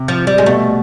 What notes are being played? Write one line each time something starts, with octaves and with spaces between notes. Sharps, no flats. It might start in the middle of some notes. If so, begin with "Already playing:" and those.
Already playing: C3
F3
G3
G#3
B2 A3